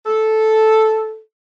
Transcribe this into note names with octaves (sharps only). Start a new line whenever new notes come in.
A4